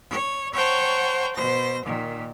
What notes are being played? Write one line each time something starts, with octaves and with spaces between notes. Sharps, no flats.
C#5
C5 C#5 F#5 G5 A5 A#5
B2 C5 A#6
A#2 D#3